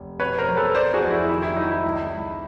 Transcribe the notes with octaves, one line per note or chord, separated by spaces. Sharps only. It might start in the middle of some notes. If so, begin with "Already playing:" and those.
Already playing: F1
B2 B4 C#5
A#4 C5
F#3
A4 B4
F1 C5 D5
F#4 G#4
F2
E4
D#3 E4
E4
F#3 D#4
E4
C#2
C#2